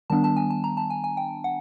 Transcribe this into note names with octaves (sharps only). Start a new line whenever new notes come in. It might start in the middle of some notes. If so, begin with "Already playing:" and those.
D#3 G3 B3 D4 A5
A5
G#5
A5
A#5
A5
G#5
G#5
G5
F#5